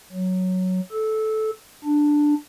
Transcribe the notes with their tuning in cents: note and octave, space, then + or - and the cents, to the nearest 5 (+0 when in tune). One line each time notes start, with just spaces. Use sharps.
F#3 +0
A4 -15
D4 +5